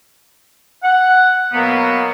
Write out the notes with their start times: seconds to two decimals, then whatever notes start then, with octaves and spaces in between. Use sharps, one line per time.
0.84 F#5
1.53 B2 F#3 A#3 B3